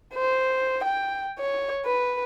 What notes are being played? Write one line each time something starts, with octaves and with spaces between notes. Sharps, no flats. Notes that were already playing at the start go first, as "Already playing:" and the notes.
C5
G5
C#5
B4